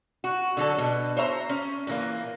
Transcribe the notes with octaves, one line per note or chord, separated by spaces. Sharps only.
F#4
D3 F#3 A4
B2
C5 C#5 E5 A#5
C#4
A#2 E3 A#3